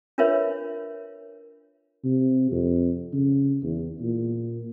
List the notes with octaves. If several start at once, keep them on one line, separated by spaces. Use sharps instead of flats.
D4 F4 A#4 B4 C#5 E5
C3
F2
C#3
E2
A#2